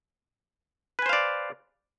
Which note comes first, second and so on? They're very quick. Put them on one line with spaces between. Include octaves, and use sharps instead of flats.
B4 G#5 C5 F5 D5